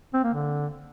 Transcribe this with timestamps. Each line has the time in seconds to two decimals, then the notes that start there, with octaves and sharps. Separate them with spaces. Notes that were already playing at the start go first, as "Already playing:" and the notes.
0.14 C4
0.24 A#3
0.34 D3